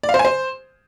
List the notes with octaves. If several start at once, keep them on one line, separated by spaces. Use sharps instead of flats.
D5
F5
C5
G#5
C5